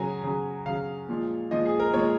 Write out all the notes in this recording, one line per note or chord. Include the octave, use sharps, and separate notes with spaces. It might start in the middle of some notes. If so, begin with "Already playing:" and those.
Already playing: C#3 F#3 G#5 A#5
C#3 F#3
C#3 F#3 F5
A#2 F3 G#3
A#2 F3 G#3 D#5
G#4
A#4
A#2 F3 G#3 C#5